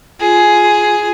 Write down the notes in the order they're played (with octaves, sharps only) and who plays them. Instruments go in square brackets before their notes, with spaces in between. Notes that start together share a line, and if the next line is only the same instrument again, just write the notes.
[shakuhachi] F4 [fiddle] G#4